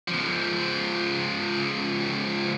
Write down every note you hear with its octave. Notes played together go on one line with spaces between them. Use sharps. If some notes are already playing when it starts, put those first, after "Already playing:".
C#2 F3